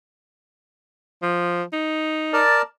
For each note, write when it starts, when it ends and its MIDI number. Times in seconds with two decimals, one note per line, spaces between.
1.22 1.63 53
1.73 2.41 63
2.33 2.62 70
2.33 2.62 74
2.33 2.62 81